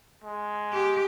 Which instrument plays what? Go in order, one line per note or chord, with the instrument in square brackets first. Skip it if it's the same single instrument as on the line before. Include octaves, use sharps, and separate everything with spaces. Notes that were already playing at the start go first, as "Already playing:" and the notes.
[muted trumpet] G#3
[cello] G4